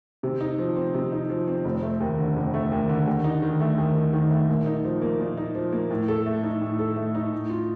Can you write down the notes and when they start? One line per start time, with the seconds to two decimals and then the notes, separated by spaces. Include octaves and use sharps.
0.23 C3
0.41 D#4
0.58 F3
0.77 C4
0.94 C3
1.12 D#4
1.30 F3
1.48 C4
1.65 F1
1.83 A3
2.00 D#2
2.19 D3
2.36 F1
2.54 A3
2.72 D#2
2.89 D3
3.07 D#2
3.24 D#4
3.42 D#3
3.60 A3
3.78 D#2
3.95 D#4
4.13 D#3
4.30 A3
4.49 A#2
4.66 D#4
4.84 F3
5.02 A#3
5.20 A#2
5.37 D#4
5.55 F3
5.73 A#3
5.90 A2
6.08 A4
6.26 A3
6.43 D#4
6.61 A2
6.79 A4
6.96 A3
7.15 D#4
7.32 A2
7.49 F4